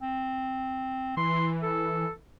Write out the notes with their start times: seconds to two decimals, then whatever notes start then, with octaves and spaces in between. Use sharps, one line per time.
0.01 C4
1.17 E3 C6
1.63 A4